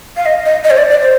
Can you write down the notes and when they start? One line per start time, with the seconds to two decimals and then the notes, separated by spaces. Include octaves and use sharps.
0.17 F5
0.26 D#5
0.46 D#5
0.64 D#5
0.70 C5
0.77 D5
0.90 D5
1.02 C5